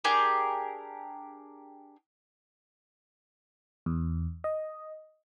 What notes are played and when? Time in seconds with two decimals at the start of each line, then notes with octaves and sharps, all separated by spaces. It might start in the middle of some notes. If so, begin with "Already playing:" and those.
0.04 D4 G4 G#4 A#4
3.86 E2
4.44 D#5